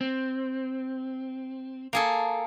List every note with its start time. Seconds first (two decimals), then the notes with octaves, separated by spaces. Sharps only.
0.01 C4
1.93 A#3 G#4 A4